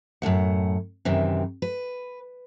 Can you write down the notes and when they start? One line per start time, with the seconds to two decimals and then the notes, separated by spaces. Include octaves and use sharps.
0.22 F#2 A2 A#3 F#5
1.05 F#2 C3 D#3 E3
1.62 B4